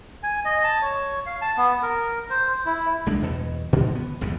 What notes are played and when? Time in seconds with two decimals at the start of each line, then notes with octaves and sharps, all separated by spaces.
0.23 G#5
0.45 D#5
0.64 A5
0.82 C#5
1.26 F5
1.42 A5
1.57 B3
1.83 A#4
2.30 C5
2.66 E4
3.06 B1 G#3 A#3 D4
3.22 E2 G2 B2
3.73 A#2 D3 F3 G3
3.95 B3
4.21 G#1 F2 G#2 C#3